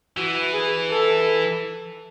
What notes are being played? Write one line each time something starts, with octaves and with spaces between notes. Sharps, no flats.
E3 F#4
G#4
A4